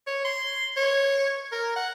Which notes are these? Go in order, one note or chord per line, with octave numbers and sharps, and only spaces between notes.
C#5
C6
C#5
A#4
F#5